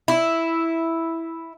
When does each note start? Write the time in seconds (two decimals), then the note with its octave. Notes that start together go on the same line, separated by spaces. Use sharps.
0.08 E4